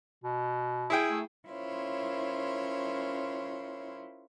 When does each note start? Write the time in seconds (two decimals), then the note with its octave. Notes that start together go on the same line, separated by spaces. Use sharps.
0.24 B2
0.90 E4 G#4 G5
1.10 A3
1.48 C#4 E4 F4 A#4 C5 C#5